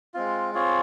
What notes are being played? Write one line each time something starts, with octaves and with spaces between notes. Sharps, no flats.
G#3 C4 F4
C4 F4 G#4 C#5